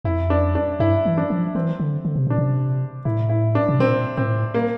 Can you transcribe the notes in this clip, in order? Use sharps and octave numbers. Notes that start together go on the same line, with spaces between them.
F2 E4
D4
D4
G2 E4
E3
D4
F3
E3 C4
D3
D3
C3
A#2 D4
C3
A2 E4
E4
D4
C3
A#2 C4
A2 C4
A#3